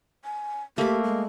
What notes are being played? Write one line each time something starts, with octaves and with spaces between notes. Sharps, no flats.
G#5
A3 A#3 G4 B5
G#3